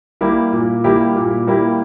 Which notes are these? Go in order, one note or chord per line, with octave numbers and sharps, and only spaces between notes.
G3 A#3 E4 G4
A#2
G3 A#3 E4 G4
A#2
G3 A#3 E4 G4